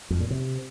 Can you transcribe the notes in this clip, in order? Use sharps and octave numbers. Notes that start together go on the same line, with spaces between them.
F2
A#2
C3